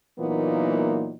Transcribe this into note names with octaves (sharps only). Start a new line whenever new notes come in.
A#2 E3 F#3 A#3 B3 D#4